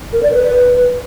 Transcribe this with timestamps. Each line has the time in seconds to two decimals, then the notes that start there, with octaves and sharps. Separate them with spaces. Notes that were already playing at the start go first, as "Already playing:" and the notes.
0.13 A#4
0.23 D5
0.32 B4